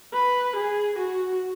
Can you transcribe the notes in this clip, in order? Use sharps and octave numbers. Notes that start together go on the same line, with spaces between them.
B4
G#4
F#4